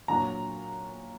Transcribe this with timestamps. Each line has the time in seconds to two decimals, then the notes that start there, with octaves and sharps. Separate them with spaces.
0.08 A#2 F#3 D4 A#5